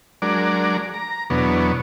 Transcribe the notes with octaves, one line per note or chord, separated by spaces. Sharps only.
F#3 G#3 D4 A#4 D5
A#5
E2 B2 F#3 B3 D4 C#5